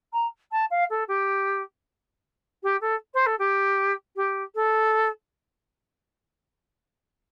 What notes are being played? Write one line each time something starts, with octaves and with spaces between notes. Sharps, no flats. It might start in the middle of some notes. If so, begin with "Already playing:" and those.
A#5
A5
F5
A4
G4
G4
A4
C5
A4
G4
G4
A4